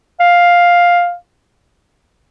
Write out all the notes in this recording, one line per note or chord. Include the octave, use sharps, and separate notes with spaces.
F5